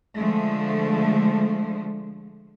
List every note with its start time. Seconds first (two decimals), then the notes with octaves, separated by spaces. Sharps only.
0.17 D3 F3 G#3 A3